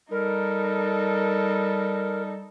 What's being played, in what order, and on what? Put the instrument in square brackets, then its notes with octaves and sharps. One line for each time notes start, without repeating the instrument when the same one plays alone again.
[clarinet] G3 [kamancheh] D#4 A4 [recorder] A#4